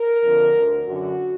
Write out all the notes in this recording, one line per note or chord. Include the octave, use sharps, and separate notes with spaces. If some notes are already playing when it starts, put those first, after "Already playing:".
Already playing: A#4
F2 D3
D2 D3
F#2 D3 F#4